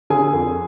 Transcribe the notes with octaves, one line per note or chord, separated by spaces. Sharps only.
D3 G#4 G#5
F2